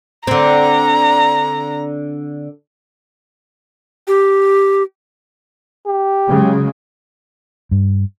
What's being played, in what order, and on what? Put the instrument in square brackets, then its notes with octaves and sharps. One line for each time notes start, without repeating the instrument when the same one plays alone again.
[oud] D3 C4 [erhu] A#5
[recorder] G4
[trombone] G4
[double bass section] C#3 F#3 G#3
[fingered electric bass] G2